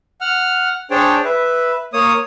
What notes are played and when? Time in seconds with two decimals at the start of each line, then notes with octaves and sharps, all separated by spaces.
0.21 F#5 F6
0.91 D4 G#4 C5 C#5 G5 A5
1.24 B4 E5
1.93 A#3 C#5 D#6